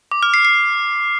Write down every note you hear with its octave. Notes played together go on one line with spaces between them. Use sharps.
D6
F6
C7
C7